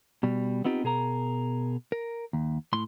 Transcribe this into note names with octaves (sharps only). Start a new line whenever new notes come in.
B2 G3
B3 C4 D#4 F4 G4
B2 G#4 A#4 A#5
A#4
D#2
A2 C6